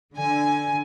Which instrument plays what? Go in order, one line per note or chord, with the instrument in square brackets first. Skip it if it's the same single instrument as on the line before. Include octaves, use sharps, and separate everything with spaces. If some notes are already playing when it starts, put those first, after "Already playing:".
[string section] D3 G#5